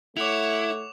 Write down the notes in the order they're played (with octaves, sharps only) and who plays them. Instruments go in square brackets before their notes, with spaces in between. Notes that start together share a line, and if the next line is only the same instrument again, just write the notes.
[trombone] A3 [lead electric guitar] E4 [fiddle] C#5 F#5 [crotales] D6 F7